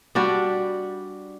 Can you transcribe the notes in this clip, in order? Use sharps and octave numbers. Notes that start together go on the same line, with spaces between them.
G3 D4 F#4